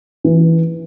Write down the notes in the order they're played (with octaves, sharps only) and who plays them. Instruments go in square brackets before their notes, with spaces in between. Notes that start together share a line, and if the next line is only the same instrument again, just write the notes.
[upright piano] E3